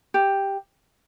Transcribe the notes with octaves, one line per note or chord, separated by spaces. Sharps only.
G4